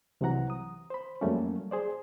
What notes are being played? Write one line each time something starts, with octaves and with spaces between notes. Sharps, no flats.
C2 C3 E3 F#3 F#5 A#5
D#6
C5 B5
F2 F#3 G3 A3 A#3 C#4
G#4 C5 D5